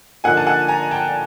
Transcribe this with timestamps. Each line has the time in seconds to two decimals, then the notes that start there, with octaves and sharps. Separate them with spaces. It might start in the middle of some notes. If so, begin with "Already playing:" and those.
0.24 D3 F3 A#3 D#4 F#5 G#5
0.37 A5
0.46 F#5 G#5
0.68 G#5 A#5
0.91 G5 A5